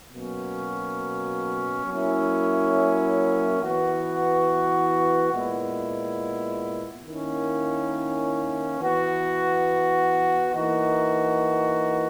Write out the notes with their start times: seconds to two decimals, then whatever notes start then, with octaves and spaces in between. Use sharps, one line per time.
0.13 B2 F#3 A#3 C#4
1.86 F#3 A#3 C#4 E4
3.60 E3 B3 F#4
5.33 A#2 G#3 B3 E4
7.06 D#3 A#3 C#4 E4
8.79 E3 B3 F#4
10.53 E3 A#3 D#4 F#4